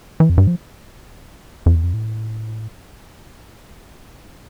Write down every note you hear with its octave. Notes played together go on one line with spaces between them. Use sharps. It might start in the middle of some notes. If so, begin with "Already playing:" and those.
E3
F2
G2
F3
F2
E2
F2
A2